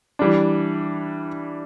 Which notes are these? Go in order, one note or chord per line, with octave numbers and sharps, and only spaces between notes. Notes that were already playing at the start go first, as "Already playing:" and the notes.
E3 G3 D4